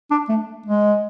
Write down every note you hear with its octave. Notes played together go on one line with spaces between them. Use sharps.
D4
A3
G#3